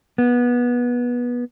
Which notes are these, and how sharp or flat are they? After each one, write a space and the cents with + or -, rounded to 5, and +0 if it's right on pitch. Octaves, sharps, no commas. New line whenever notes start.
B3 -20